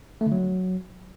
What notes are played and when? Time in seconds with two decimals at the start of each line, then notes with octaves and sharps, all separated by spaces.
0.21 A3
0.26 D3
0.32 F#3